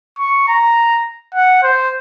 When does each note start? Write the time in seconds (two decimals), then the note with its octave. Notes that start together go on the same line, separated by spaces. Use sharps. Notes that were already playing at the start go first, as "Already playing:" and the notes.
0.19 C#6
0.48 A#5
1.34 F#5
1.63 C5